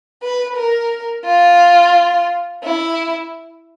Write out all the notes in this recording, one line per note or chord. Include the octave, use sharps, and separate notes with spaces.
B4
A#4
F4
E4